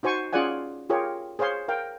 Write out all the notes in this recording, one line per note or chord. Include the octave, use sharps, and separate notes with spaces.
D#4 F#4 C5 G#5 C#6
C#4 F4 G#4 D5 F#5 G#5
F4 G4 G#4 A#4 C#5
G#4 C5 C#5 F5 C6
A#4 F5 G5